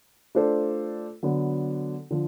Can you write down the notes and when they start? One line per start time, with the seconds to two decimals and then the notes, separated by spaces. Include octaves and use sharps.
0.35 A3 D4 F4 A4 C5
1.23 D3 F#3 B3
2.11 D3 F3